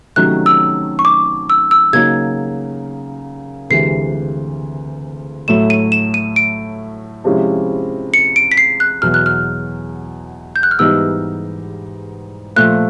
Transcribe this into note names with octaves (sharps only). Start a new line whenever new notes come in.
C3 D#3 F#3 A3 C#4 F#6
E6
C#6
D6
E6
E6
C#3 F#3 A#3 D#4 G#6
D2 C3 E3 G#3 C7
A2 F#3 A3 E7
D#7
E7
D#7
D7
C3 F3 G#3 C#4 E4
C#7
D7
B6
C7
F#6
E2 B2 F#3 F6
F#6
F6
G6
F#6
F6
G#2 E3 G3 B3 D#4 E6
A#2 F3 A3 F#6